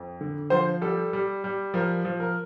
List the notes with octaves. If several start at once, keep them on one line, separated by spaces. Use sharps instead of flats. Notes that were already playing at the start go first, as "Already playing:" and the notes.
Already playing: F2
D3
F3 C5
G3 A4
G3
G3
F3 A#4
F3
A#4